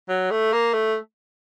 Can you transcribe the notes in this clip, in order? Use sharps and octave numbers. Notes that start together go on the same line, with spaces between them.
F#3
A3
A#3
A3